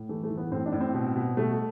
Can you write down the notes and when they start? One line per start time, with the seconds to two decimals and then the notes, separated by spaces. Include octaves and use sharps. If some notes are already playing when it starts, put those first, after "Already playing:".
Already playing: A2
0.09 E3 A3
0.23 A3
0.30 E3
0.37 B3
0.51 A2 C4
0.66 D4
0.73 A2
0.81 C4
0.94 B2
1.16 B2
1.37 B2 A3